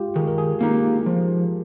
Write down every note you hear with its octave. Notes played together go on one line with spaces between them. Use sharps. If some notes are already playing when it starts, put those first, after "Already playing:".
Already playing: G#3 F4 G4
D#3 G#4
A#4
G#4
A#3 D#4 G4
F3